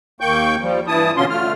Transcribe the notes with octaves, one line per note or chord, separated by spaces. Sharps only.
D#2 A#3 G5 C#6 G6
F3 G3
G2 E3 E4 A5 D#6
B2 D3 C#4 F4 C6
D3 A3 F4 F6